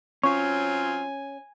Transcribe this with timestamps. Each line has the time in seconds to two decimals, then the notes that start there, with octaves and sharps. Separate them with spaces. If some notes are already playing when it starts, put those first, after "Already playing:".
0.23 F#3 C4 C#4 F4 G#5 C#6